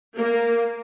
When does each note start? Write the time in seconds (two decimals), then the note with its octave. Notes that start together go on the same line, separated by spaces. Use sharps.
0.17 A#3